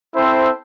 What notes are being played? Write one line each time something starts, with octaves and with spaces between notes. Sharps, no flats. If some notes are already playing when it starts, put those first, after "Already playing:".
C4 E4 A4 C5